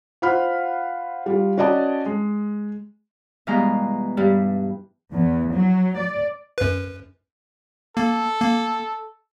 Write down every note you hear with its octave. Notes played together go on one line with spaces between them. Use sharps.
F4 C5 F#5 B5 F6
G3 F4
C#4 F#4 D5 D#5 A5
G#3
B2 E3 G3 G#3 F5 A#5
G2 G3
E2
F#3
D5
F#2 B4
A#3 A4
A#3